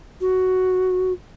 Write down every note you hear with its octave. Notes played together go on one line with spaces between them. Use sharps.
F#4